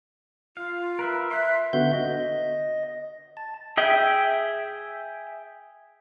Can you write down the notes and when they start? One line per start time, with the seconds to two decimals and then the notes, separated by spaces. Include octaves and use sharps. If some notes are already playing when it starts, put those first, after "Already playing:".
0.57 F4 F5
0.99 A#4 B4 E5
1.31 E5 C6 F#6
1.73 D3 B3 F#4 E5 G6
1.93 D#5
3.37 A5
3.77 G#4 E5 G5